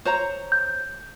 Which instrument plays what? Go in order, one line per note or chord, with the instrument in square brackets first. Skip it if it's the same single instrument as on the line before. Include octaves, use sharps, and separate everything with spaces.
[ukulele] C5 C#5 A#5
[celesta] G6